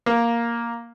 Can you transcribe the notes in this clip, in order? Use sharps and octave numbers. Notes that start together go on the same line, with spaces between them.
A#3